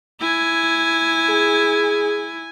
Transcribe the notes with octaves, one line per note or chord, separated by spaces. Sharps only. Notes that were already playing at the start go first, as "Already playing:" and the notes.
E4 G#5
G#4